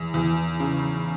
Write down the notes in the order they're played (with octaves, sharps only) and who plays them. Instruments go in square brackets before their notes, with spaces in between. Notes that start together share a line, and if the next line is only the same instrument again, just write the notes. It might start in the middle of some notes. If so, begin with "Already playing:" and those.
Already playing: [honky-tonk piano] E2
E2
C#3